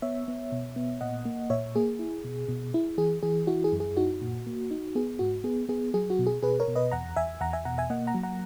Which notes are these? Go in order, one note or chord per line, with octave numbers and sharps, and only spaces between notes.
B3 C#5 E5
B3
B2
B3
A#2 D#5 F#5
A#3
A#2 C#5 E5
A#3 G#4
E4
B2
B2
E4
E3 G#4
E3 G#4
E4 F#4
G#4
F#2
G#4
D#4 F#4
A#2
A#3
D#4
B3 G#4
G#2 F#4
B3 G#4
B3 G#4
F#3 G#4
F#4
B2
G#4
B2 G#4 B4
A#4 C#5
B2
B4 D#5
E2 F#5 A#5
E2 E5 G#5
E2 F#5 A#5
E5 G#5
B2 F#5 A#5
E5 G#5
A#3 D#5 F#5
F#5 A#5
F#3
F#5 A#5